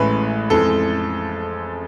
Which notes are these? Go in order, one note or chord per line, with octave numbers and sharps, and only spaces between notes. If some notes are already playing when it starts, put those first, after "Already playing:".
Already playing: A1 A2 G#3 B4
F2 E3 G#3 A4